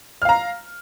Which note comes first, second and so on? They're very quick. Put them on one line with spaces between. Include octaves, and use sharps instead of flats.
F6 F5 A#5